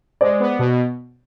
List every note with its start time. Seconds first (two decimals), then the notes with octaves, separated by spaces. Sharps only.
0.21 G#3 C5 D5
0.40 B3
0.59 B2